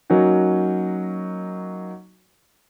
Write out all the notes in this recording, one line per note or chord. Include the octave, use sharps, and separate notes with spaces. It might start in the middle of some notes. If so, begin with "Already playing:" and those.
F#3 A#3 C#4 D#4 F#4